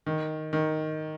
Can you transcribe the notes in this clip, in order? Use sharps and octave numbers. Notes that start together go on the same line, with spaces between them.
D#3
D#3